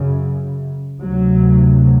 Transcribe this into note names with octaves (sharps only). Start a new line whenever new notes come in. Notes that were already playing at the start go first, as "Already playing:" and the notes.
Already playing: F#2 C#3
D2 C3 F#3